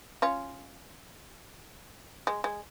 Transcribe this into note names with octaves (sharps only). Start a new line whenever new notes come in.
C#4 F4
G#3
G#3